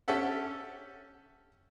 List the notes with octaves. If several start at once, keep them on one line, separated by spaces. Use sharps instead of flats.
C#4 G4 A4 E5 F#5